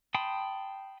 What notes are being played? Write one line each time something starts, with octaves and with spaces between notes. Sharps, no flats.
G5 A5 B5 C6 D#6